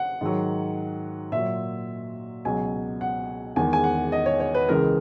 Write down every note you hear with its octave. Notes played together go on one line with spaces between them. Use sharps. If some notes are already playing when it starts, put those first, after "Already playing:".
Already playing: F#5
G#2 D#3 F#3
A#2 F#3 E5
C#2 B2 F#3 G#5
F#5
E2 D#3 G#3 G#5
G#5
F#5
D#5
C#5
C#5
B4
C#2 C#3 E3 G#3 A#4